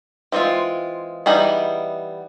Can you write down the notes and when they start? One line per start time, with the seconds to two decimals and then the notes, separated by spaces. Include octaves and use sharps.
0.32 E3 G#3 C4 F4
1.26 E3 G3 B3 D#4 G#4